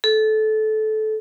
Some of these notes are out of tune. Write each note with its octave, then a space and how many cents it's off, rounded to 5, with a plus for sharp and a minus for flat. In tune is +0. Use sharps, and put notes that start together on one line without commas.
A4 -20